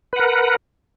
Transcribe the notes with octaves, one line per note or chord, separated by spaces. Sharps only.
A#4 B4 F#5